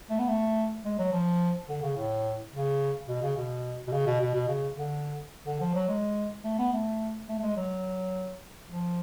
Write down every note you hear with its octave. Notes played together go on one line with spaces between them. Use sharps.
A3
B3
A3
G#3
F#3
F3
D3
C#3
A2
C#3
B2
C#3
B2
B2
C#3
B2
B2
B2
C#3
D3
D3
F3
F#3
G#3
A3
B3
A3
A3
A3
G#3
F#3
F3